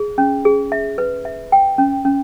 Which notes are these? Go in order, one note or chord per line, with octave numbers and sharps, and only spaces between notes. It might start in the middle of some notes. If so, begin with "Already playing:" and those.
Already playing: G#4
C#4
G#4
E5
B4
E5
G5
C#4
C#4